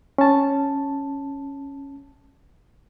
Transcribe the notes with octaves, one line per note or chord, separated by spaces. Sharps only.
C#4 A5